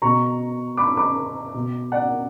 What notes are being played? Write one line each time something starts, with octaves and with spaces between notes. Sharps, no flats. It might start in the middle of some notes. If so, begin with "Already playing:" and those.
B2 A#5 C#6
B5 D6
B5 D6
B2
D5 F#5